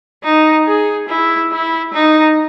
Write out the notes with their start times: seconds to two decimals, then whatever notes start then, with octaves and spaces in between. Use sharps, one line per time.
0.24 D#4
0.67 G#4
1.08 E4
1.52 E4
1.93 D#4